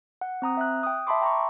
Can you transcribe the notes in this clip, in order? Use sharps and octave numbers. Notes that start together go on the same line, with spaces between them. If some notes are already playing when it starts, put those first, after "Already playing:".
F#5
C4 A#5 D#6
E5 F#6
G5 D#6
E5 A5 B5 C6 D6
G5 A#5 C6 C#6